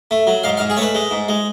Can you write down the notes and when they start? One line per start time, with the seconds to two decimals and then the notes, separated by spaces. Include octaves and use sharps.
0.11 A3
0.27 F#3
0.44 G#2 F5
0.57 F5
0.60 G#2
0.70 G#4
0.77 A3 B4 C#5
0.95 G#3
1.11 G#2
1.29 G#3